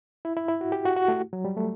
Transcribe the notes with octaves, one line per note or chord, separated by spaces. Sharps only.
E4
E4
E4
F#4
G4
F#4
F#4
A3
F#3
G3
A3